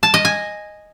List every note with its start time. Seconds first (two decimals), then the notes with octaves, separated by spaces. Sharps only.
0.03 A5
0.14 D#5
0.25 G#5